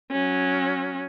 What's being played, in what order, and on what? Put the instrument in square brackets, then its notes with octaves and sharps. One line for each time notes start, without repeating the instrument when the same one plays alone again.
[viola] F#3 C#4